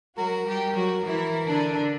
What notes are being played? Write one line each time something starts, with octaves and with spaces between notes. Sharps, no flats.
F#3 F#4 A#4
G3 G4
F#3 F#4
E3 E4
D3 D4